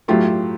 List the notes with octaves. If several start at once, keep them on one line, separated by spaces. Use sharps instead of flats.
A2 F#3 A3 F4 G4